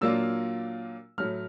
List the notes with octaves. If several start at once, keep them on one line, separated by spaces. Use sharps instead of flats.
A#2 F#3 A#3 D4 F4 E6
A2 F#3 A3 F6